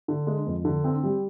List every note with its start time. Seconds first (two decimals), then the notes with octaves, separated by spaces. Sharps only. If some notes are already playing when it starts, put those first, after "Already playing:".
0.08 D3
0.27 G#3
0.46 F2
0.65 D3
0.84 C4
1.03 G3